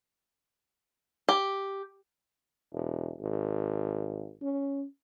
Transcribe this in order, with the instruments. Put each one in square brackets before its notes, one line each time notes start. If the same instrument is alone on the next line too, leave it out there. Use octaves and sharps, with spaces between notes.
[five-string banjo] G4
[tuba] E1
G#1
C#4